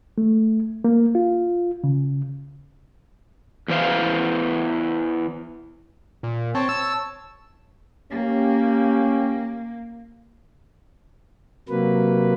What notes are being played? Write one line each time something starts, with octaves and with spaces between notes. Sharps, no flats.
A3
A#3
F4
C#3
E2 E3 C5 F5
A#2
C4 C#5 A5
E6
A#3 C#4 G4
C3 F#3 A#3 B4